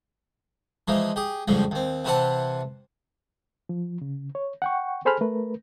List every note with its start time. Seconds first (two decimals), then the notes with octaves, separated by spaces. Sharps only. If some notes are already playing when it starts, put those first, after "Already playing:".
0.88 E3 F3 G#3 D#4
1.16 G4 G#4
1.48 F2 G#2 C#3 F3 G3
1.71 D#2 C4
2.05 C3 E3 E4 C5 F#5 A5
3.69 F3
4.02 C#3
4.35 C#5
4.62 F#5 G5 C#6
5.05 G#4 A4 C5 G#5 B5 F6
5.21 A3 A#4 B4